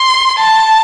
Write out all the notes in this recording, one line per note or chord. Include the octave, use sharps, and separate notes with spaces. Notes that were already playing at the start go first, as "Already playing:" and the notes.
Already playing: C6
A5